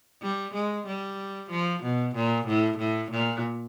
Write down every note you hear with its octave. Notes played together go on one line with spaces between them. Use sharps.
G3
G#3
G3
F3
B2
A#2
A2
A2
A#2